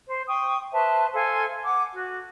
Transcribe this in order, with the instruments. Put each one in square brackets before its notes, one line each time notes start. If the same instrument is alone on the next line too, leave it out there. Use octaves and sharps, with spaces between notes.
[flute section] C5
G5 C#6 D#6
B4 C5 E5 A5
A4 C5 F5 G#5
F#5 D6
F#4